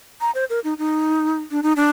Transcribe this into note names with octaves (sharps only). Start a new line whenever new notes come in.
A#5
C5
A#4
D#4
D#4
D4
D#4
D4